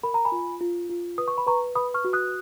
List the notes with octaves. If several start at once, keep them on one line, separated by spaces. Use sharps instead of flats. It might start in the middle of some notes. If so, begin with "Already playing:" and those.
A#4 B5
A#5
G#5 B5
F4
F4
F4
B4 D#6
C#6
B5
B4 A#5 C#6
B4 B5 D#6
C#6 F6
F#4
D#6 F#6